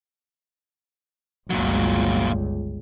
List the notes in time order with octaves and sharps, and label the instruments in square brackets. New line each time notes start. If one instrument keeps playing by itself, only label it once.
[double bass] G1 C#2 [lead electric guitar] A#2 F#3